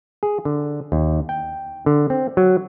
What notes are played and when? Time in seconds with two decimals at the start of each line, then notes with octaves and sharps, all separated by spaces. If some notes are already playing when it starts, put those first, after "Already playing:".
0.23 G#4
0.45 D3
0.92 D#2
1.29 G5
1.86 D3
2.10 C4
2.37 F#3